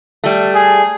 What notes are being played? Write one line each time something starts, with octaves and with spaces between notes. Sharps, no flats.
G3 A3
G#4